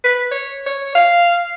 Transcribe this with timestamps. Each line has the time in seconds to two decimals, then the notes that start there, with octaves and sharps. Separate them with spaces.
0.04 B4
0.31 C#5
0.66 C#5
0.95 F5